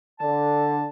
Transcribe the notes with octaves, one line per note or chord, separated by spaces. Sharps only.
D3 A5